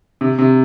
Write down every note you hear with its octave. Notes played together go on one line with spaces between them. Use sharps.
C3
C3